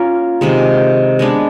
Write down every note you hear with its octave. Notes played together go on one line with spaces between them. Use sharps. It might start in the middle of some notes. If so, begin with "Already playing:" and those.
Already playing: A#3 C#4 F4 A#4
C3 D#3 G#3
G#3 B3 D4